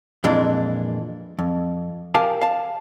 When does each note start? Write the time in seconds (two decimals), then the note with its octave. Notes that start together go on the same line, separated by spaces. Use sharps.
0.24 F2 A#2 E3 G#3 D4
1.39 F2
2.14 G4 A#4 F5 G#5 A5
2.41 F5 A5